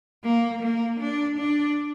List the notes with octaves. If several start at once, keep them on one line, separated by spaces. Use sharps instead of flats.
A#3
A#3
D4
D4